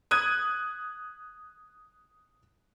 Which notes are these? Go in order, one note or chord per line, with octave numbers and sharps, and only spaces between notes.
D#6 F#6 G#6 D#7